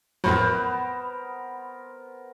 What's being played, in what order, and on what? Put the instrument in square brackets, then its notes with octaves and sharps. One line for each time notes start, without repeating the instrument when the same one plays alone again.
[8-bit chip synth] F2 A2 F#3 [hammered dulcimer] B3 A#4 C5 [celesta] B5